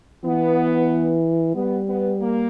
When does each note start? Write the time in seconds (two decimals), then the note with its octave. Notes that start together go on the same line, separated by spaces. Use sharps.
0.25 E3 B3
1.55 G3 B3
1.87 B3
2.20 A#3